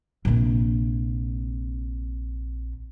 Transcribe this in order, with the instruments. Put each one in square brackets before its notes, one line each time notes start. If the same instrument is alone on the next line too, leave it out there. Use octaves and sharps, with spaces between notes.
[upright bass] A#1 C3